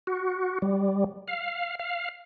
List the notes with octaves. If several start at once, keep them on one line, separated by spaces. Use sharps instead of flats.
F#4
G3
F5
F5